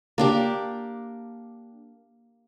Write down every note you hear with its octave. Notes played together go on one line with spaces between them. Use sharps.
A#3 D4 G4